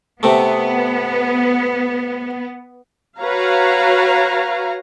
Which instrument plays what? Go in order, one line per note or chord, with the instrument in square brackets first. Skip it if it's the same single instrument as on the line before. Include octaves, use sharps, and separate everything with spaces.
[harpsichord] C3 A3 [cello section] B3
[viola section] F#4 B4 C#5 F5 A#5